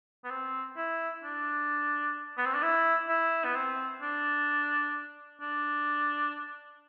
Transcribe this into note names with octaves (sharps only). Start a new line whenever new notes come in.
B3
C4
E4
D4
B3
C4
D4
E4
E4
B3
C4
D4
D4